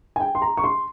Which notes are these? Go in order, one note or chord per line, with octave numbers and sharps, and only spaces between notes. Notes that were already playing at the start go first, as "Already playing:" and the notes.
G#5
G5
C6
A#5
C#6
C6